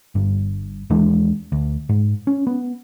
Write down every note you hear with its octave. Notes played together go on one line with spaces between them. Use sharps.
G1 G2
D#2 E3 G#3 D4
D2
G#2
C#4
B3